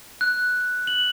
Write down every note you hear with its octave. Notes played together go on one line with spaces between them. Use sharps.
F#6
F#7